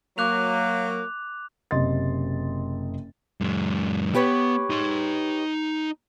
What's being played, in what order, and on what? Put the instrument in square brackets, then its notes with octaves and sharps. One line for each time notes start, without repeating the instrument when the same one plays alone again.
[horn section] F#3 A#3 [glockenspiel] D6 F#6 F7
[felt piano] F#1 C3 D#5 C6 A6
[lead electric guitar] F#2 G#3
[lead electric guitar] B3 [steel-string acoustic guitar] G4 B4 C#5
[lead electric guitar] D#4 C6